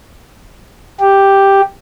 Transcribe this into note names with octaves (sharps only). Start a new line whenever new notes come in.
G4